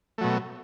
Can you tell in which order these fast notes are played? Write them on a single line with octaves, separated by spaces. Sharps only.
A3 F#3 B2